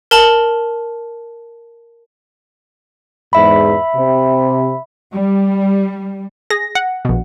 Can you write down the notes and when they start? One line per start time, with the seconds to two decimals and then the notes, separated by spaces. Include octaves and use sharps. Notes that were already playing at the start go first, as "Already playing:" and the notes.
0.11 A#4 A5 F#7 G7
3.33 E2 G#2 E5 B5
3.95 C3
5.13 G3
6.50 G#4 A#6
6.75 F#5
7.05 A#1 B2